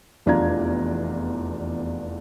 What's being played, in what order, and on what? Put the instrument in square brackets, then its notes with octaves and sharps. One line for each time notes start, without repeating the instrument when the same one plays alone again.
[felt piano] F1 E2 D4 F4 A#5 G#6